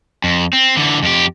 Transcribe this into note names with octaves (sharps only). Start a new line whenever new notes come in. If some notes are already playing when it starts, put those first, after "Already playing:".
F2
C4
D3 E3
F2 G4